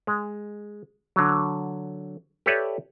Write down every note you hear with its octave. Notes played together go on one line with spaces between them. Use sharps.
G#3
D3 F#3
G4 A4 B4 C#5 D5 E5